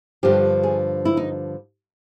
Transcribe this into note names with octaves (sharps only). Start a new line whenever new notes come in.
G2 D3 F3 G4
G#4
E4
D#4